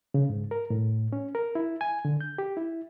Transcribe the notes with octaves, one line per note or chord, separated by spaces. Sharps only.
C#3
G#2
A#4
A2
C#4
A#4
E4
G#5
D3
G6
G4
E4